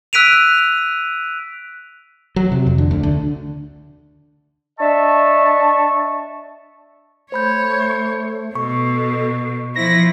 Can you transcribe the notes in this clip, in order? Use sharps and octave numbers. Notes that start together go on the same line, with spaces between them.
E6 F#6 B6 D7 D#7 F7
F#3
C3
F2
D3
D2
D3
D4 D#5 E5 A5 C#6
A3 C5 C#5 B5 G6
B2 A4 C#6
F3 E4 C5 A#6